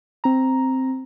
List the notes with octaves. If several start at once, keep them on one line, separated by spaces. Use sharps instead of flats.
C4 A#5